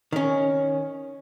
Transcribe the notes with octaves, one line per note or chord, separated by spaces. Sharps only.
D#3 C#4